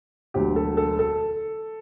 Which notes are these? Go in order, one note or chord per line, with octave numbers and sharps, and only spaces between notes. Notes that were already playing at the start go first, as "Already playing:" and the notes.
E1 D2 D3 F#3 G4
A4
A4
A4